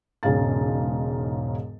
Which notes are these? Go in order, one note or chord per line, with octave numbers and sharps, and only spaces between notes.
E1 G#2 C#3 F5 A6